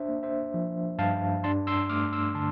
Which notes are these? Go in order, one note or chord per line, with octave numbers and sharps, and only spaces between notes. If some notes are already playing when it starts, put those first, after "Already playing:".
Already playing: D4 C5 E5
A#3
C5 E5
F3
G2 F5 A5
D4 A5 C6
C6 E6
A3 D6 F6
C6 E6
D3 A5 C6